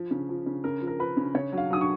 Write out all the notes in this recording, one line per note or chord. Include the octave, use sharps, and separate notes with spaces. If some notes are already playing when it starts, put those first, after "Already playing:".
Already playing: F3
C#3
F3
C#3
C#3 A#4
F3
A#4
F3 B4
C#3
C#3 C#5
F#3
F5
F#3 D#6
C#6